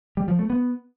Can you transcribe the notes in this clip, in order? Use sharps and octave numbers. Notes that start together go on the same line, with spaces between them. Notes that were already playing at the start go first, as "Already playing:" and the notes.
G3
F3
A3
B3